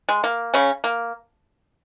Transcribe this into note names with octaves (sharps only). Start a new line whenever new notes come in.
G#3
A#3
C#3 C#4
A#3